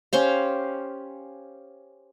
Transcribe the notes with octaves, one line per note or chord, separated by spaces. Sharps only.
C#4 G4 C5 F5